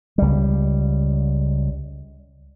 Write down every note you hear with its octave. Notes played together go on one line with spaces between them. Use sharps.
C#2 G3